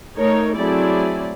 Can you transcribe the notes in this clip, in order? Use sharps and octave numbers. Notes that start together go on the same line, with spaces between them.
A3 D#4 A#4 C#5
F#3 A3 C4 E4 G#4 D5